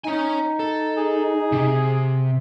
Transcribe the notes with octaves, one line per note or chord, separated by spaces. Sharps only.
D#4 C#5 G#5
A4
G#4
C3